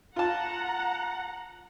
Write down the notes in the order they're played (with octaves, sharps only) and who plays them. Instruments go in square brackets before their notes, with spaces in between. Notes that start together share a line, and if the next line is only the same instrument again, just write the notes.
[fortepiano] F4 A5 [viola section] F#5 A#5